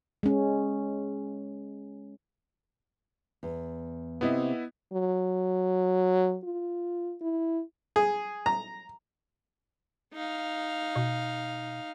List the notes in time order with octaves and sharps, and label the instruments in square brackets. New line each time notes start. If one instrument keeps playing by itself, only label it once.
[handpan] G#3 C#4
[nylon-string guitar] E2
[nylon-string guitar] C3 C4 [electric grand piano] B3 E4 D#5
[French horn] F#3
F4
E4
[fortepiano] G#4
A#5
[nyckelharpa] D#4 F5
[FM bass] B2